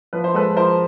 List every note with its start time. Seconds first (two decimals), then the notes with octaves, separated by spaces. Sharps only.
0.13 F3 B4
0.24 C5
0.34 G#3 A4 B4
0.53 B4
0.56 F3 A#4 C5